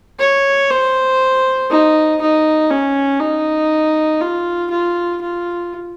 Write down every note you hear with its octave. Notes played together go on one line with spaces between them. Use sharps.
C#5
C5
D#4
D#4
C#4
D#4
F4
F4
F4